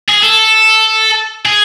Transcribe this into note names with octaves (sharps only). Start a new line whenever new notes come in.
G#4
A4
G#4